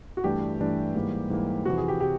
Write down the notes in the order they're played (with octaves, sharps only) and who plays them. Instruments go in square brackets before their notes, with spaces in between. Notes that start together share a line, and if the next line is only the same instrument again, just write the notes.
[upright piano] F#4
[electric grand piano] G2 E3 A3 D4 [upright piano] G4
[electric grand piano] G2 E3 A3 D4
G#2 E3 G3 A#3
G#2 E3 G3 A#3
[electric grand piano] F2 C3 E3 [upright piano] F#4
[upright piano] G#4
G4
[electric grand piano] C3 E3 [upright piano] G4